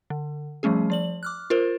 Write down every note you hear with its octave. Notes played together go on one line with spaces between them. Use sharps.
D3
F3 G3 A3 C#4 G#4
F3 D5 F#7
D6 F6 F#6
F4 A#4 C5